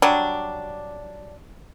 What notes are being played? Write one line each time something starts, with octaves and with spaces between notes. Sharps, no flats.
F#3 G3 D4